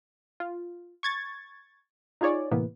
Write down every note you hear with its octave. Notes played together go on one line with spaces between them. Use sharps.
F4
C#6 G#6 A6
D#4 F4 G#4 C#5 D5
A2 C3 E3 A#3 B3